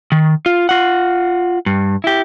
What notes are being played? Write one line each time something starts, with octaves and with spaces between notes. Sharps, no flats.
D#3
F4
F4 F#5
G2
E4 G4